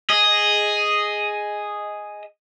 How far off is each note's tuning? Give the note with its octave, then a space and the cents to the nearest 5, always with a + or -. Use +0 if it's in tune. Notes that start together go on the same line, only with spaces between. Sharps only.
G#4 +0 D#5 +0